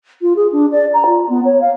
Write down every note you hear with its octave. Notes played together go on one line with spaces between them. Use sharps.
F4
G#4
D4
D5
A#5
F4
B3
C#5
F5